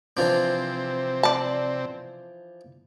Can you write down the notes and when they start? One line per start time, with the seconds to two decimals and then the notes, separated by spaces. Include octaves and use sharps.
0.17 C3 E3 F3 C4 D4
1.23 D5 A5